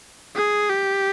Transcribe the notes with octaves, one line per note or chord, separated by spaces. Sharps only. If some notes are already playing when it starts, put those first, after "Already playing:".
G#4
G4